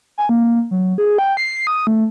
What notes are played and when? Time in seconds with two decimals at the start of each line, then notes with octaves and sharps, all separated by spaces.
0.18 G#5
0.29 A#3
0.71 F#3
0.98 G#4
1.18 G5
1.37 C7
1.67 D#6
1.87 A3